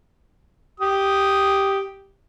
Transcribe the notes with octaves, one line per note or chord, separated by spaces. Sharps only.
G4 D#6